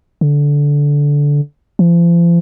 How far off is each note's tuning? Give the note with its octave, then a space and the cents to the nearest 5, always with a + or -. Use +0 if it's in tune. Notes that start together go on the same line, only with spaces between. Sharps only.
D3 -15
F3 -40